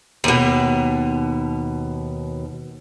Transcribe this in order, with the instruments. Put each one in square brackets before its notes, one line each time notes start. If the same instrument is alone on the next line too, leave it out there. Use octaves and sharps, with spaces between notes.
[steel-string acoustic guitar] D#2 B2